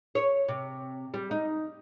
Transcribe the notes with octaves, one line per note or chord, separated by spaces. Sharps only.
C#5
C3
G3
D#4